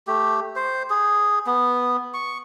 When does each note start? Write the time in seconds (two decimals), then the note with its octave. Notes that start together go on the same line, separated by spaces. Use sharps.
0.07 A3 G4
0.56 C5
0.90 G#4
1.47 B3
2.14 C#6